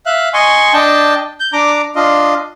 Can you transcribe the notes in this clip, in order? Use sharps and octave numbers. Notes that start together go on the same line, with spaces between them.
E5 F5 F#6
D#5 G#5 C6 C#6
D4 D#5 G5 A5
G6
D4 A#5 D6
D4 F4 D#5